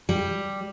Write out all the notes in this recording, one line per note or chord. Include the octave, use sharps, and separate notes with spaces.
G3